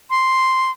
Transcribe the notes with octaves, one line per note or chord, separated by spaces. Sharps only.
C6